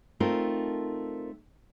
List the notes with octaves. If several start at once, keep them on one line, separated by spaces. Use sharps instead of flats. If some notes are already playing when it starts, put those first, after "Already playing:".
A3 C4 D#4 F4 A#4